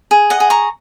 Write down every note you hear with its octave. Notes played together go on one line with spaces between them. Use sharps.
G#4
D#5 F#5
G#4
A#5 C#6